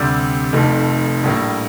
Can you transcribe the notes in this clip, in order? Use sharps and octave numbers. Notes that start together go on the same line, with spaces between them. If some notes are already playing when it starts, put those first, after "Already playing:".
Already playing: D2 C3 G3 C4 D5
F1 F2 D#3 A3
A#1 A2 G3 A#3